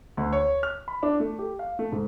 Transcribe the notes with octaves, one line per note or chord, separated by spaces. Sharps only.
D2
C#5
F6
B5
D4
A3
G4
F5
A3
G#2